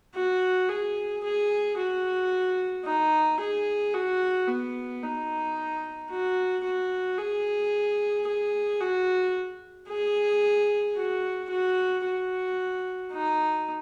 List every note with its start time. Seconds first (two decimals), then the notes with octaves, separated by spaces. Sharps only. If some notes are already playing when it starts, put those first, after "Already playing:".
0.15 F#4
0.69 G#4
1.24 G#4
1.78 F#4
2.85 D#4
3.40 G#4
3.94 F#4
4.47 B3
5.02 D#4
6.10 F#4
6.64 F#4
7.18 G#4
8.27 G#4
8.81 F#4
9.89 G#4
10.96 F#4
11.50 F#4
12.05 F#4
13.13 D#4